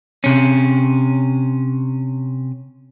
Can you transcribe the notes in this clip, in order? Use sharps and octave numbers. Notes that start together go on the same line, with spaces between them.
C3 C#4